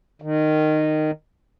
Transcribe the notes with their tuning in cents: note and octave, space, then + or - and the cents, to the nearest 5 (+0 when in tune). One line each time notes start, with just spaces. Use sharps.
D#3 -15